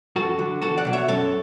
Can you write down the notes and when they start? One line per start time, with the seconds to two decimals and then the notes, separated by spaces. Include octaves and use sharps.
0.16 F#2 F#4 A4
0.39 D3 F#3
0.62 E2 F#4 A4
0.77 D5 F#5
0.85 B2 F#3
0.93 C#5 E5
1.08 F#2 A4 C#5